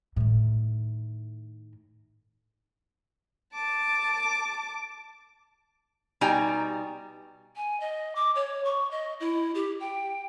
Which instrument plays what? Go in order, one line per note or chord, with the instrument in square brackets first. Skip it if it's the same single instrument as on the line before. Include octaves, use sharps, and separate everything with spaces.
[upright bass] A2 D#3
[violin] A5 D6
[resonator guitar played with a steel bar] B2 G3 D#4 G5 G#5 A#5
[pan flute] G#5
D#5
D6
C#5
C#6
D#5
E4
G4
G5